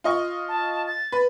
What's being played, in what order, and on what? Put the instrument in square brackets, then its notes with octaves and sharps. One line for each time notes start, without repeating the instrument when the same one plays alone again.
[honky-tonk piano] F4 D#5 C#6
[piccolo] A5
A6
[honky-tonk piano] B4